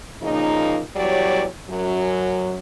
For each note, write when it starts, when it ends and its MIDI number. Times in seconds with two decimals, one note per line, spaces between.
0.23 0.81 46
0.23 0.81 49
0.23 0.81 53
0.23 0.81 58
0.23 0.81 63
0.97 1.45 40
0.97 1.45 54
0.97 1.45 55
0.97 1.45 67
0.97 1.45 73
0.97 1.45 74
1.70 2.59 42
1.70 2.59 54